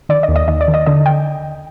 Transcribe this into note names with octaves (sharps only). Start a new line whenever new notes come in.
D#3 D5
D#5
D#2
D#5
D#2 D#5
D5
D#3
D#5
D3 D#5
G5